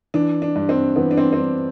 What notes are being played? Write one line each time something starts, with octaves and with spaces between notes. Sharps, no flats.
E3 D4
D4
G2
C4
E3 B3
D4
C4
C4
G2 D4